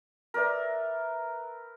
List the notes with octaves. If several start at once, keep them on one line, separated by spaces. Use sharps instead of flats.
A#4 B4 D5 E5